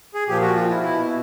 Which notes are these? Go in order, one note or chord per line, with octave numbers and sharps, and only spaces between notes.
G#4
A#2 F3 G4
F#4
F4
E4
B2 E4